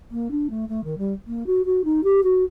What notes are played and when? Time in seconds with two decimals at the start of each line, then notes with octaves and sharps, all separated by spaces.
0.11 A#3
0.31 D4
0.50 A3
0.69 A3
0.84 D#3
0.98 G3
1.27 A#3
1.46 F#4
1.65 F#4
1.84 D#4
2.04 G4
2.23 F#4